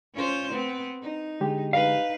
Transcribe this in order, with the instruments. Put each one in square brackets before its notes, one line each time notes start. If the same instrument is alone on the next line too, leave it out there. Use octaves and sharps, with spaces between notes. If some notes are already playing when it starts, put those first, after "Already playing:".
[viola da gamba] C#4 F4 C5
B3 C4
D#4
[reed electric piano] D3 G#3 G4
[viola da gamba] D#4 B4 [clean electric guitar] F5